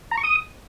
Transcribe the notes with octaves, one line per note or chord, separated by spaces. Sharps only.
A#5
C#6
D#6